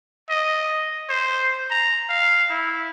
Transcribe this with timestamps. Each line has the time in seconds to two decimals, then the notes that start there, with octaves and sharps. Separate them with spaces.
0.30 D#5
1.09 C5
1.70 A#5
2.10 F5
2.50 E4